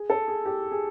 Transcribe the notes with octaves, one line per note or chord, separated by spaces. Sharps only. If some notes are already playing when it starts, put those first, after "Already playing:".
Already playing: G#4
A4
G#4
G4
G#4